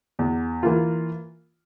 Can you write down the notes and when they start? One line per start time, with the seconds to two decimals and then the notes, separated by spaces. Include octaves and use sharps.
0.19 E2
0.63 E3 A#3 F4